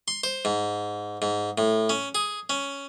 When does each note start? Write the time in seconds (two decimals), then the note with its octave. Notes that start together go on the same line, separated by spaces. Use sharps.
0.08 C6
0.24 C5
0.45 G#2
1.22 G#2
1.58 A2
1.89 C#4
2.15 G#4
2.50 C#4